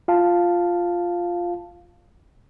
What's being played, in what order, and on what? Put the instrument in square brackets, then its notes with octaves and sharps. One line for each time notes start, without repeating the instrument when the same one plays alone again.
[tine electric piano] F4 F5 A5